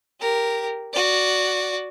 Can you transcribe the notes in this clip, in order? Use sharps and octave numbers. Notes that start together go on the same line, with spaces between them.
G4 A#4
F#4 D5